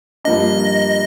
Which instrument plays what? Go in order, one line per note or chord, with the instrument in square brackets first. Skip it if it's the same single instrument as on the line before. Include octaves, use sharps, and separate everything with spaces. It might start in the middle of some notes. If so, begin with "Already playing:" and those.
[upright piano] G2 F3 A#3 D4 [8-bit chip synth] D#5